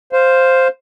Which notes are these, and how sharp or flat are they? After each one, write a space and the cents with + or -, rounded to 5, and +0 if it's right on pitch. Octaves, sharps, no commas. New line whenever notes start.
C5 +0 F5 +0